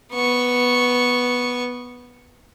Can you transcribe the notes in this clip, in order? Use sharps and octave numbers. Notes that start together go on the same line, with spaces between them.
B3 C#6